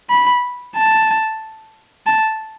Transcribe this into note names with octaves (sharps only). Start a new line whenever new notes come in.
B5
A5
A5